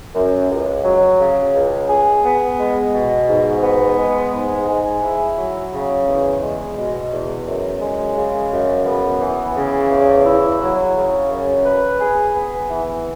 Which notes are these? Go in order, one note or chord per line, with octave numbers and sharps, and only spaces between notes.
F#2
C#2
F#3
C#3
C#2
G#4
B3
G#3
B2
G#2
B3
G#3
G#2
G#4
E4
F#3
C#3
E2
G#3
B2
E2
F#2
G#3
C#3
F#2
B3
E3
C#3
E2
E4
F#3
C#3
F#2
B4
G#4
B3
E3